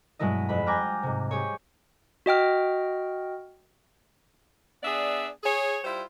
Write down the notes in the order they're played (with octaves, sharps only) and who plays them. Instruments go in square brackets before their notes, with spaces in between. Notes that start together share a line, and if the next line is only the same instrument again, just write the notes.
[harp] G2 B2 F#3 G#3 E4 D#5
F2 B5
G5 G#5 A#5 D6 F6 F#6
G#2 C3
G4 G#4 C#5
[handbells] F#4 D#5 G5 F6
[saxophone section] B3 D4 G#4 D5 E5
G#4 C#5
G3 E4 F4 C5